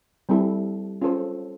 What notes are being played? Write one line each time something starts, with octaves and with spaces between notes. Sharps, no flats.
G3 C4 E4 A4
C#4 F4 A4 C5